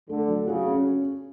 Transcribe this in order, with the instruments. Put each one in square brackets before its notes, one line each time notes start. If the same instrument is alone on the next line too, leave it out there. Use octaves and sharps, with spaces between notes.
[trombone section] D3 [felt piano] A3
[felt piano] F#3
[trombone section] C#3 [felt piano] F#4
[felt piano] C#4